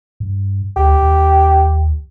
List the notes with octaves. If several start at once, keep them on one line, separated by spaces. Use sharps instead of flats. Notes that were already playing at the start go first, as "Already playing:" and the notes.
G2
D2 G4
D#2